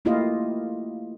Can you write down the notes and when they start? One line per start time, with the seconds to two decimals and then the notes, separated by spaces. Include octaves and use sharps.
0.05 A3 A#3 E4 F4 G4 D#5